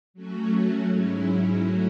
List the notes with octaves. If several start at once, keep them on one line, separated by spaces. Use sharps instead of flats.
F#3 A3 C#4 F#4
G#2 F#3 C#4 E4
F#3 A3 C#4 F#4